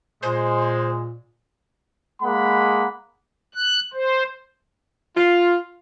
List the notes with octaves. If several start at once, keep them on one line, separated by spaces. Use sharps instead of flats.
A#2 G#3 C5
G#3 A#3 F#5 B5
F#6
C5
F4